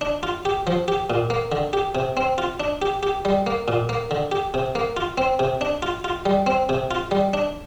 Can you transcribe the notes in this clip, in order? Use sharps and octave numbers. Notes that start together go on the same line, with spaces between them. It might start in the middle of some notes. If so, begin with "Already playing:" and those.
D4
F4
G4
F3
G4
A#2
A#3
D3
G4
C3
C4
F4
D4
G4
G4
G3
A#3
A#2
A#3
D3
G4
C3
A#3
F4
C4
C3
D4
F4
F4
G3
C4
C3
F4
G3
D4